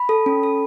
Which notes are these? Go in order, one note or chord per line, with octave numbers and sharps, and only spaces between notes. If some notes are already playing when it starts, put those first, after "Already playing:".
Already playing: B5
A4
C#4
A4